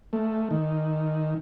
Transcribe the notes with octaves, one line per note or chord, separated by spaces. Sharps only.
A3
D#3